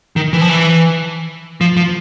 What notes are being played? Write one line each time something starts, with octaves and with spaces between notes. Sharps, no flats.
D#3
E3
F3
E3
F3
F3